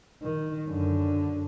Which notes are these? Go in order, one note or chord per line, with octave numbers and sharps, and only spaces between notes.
D#3
F#2 D3